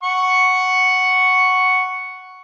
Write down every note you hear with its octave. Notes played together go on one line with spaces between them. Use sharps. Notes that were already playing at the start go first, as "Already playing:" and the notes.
F#5 C#6